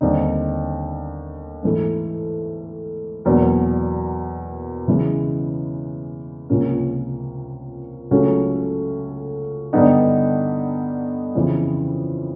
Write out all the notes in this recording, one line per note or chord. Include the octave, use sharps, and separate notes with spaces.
D#2 D3 G3 C4 D#4
G#2 E3 A3
E2 B2 F#3 A#3 D4
C#3 E3 G#3
C#2 C3 F3 A#3 C#4
C#2 C#3 F#3 A3 C#4
G2 D3 G3 B3 D#4
F2 C#3 E3